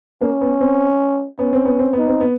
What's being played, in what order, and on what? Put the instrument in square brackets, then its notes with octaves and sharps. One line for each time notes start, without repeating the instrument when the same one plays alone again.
[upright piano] A#3 [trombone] C#4
[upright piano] B3
C4
[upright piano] B3 [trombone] C#4
[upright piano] C4
B3
C4
[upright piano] B3 [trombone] D#4
[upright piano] C4
B3